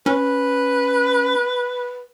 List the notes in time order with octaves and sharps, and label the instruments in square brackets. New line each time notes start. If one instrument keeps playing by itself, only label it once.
[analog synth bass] C#4 [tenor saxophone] B4